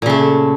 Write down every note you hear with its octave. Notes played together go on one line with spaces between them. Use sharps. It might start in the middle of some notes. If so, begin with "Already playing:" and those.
A#2 C#3 A3